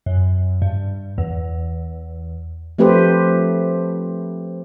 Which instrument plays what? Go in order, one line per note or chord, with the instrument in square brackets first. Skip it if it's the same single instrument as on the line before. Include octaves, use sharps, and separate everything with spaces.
[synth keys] F#2
G2
E2
[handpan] F3 A3 C4 G4 B4 C5